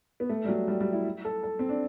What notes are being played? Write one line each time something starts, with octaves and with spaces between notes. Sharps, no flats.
B3
A3
G3
F#3
G3
G3
E4
A4
A4
C4
D4